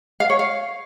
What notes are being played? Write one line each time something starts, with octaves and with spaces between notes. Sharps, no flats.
F5
C#5
F5